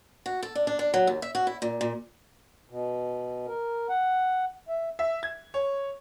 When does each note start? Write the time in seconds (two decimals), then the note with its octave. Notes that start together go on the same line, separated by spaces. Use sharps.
0.26 F#4
0.43 A4
0.55 D4
0.67 D4
0.79 D4
0.94 F#3
1.07 D#2
1.22 E5
1.35 F#4
1.47 E4
1.62 A#2
1.81 A#2
2.70 B2
3.47 A#4
3.89 F#5
4.68 E5
4.99 E5
5.23 G#6
5.54 C#5